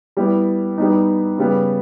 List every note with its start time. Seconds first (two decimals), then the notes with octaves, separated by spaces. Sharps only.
0.17 G3 B3 E4
0.78 G3 B3 D#4
1.38 C#3 G3 B3